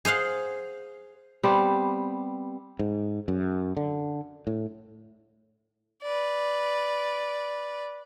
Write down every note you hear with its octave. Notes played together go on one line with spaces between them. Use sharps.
G#4 C5 F5 F#5
G3 B3 C4 G4
G#2
F#2
D3
A2
B4 D5